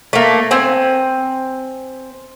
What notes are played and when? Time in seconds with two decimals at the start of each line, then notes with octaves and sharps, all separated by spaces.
0.13 A3 A#3
0.51 C4 G#5